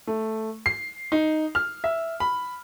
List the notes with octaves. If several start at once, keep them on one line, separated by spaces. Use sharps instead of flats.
A3
C7
D#4
F6
E5
B5